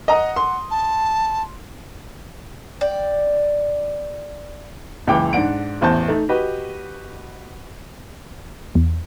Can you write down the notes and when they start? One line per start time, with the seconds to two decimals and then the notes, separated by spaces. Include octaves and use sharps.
0.08 D#5 F#5 A#5 D#6
0.36 C6
0.71 A5
2.81 D5 G5
5.07 F#1 C#2 E3 G5 D6
5.33 G#2 D4 F#5 D7
5.81 A1 E2 C5 A5 G6
6.08 A3 D#4
6.29 F#4 G4 B4 D#5
8.75 E2